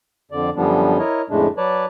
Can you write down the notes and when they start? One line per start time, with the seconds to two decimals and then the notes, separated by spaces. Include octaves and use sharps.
0.31 F2 D3 D5
0.56 F#2 D3 F3 G3 B3 D4
0.99 E4 A#4 C#5 D#5
1.30 F2 A2 C#3 G#3 A3 D4
1.57 F#3 B4 C#5 D5 A5